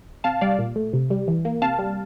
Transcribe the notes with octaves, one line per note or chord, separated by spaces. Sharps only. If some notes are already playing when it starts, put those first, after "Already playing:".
C3 F5 A5
G3 D5 F5
A#2
A3
C3
G3
E3
A#3
C3 F5 A5
G3